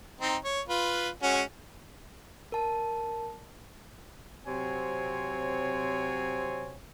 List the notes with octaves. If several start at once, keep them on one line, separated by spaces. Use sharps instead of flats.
C4 D#4
C#5
F4 B4
G#3 C#4 F#4
A#4 A5
C3 F#3 C4 C#5 G#5